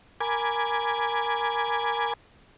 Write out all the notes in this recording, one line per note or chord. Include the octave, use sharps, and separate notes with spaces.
A#4 G#5 B5 D6 G#6